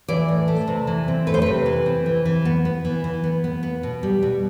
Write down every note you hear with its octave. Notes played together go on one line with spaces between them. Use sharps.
E3 D5
A2
A3
C3
E3
C4
A3 B4
C5
C3 B4
E3
C4
E3
E3
B3
B3
E3
E3
B3
B3
B3
B2
G3
B2